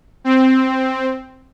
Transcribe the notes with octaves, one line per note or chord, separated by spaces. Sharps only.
C4